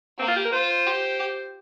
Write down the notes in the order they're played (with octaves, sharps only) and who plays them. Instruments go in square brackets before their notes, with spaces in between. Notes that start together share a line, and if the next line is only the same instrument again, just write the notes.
[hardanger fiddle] A#3 [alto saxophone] C4
[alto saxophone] F4
G4
A#4
[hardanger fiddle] F4 [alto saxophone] C5
[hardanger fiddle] G4